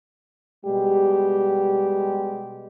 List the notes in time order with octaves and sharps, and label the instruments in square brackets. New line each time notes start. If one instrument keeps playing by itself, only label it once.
[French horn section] B2 G3 G#3 G4